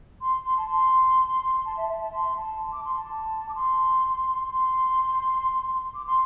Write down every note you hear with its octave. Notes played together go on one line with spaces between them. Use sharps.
C6
C6
A5
C6
A5
E5
E5
A5
C6
A5
D6
C6
A5
D6
C6
C6
D6
C6